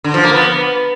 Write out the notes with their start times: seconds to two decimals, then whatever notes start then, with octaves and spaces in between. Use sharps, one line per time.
0.04 D3
0.14 F3
0.24 A#3
0.33 B3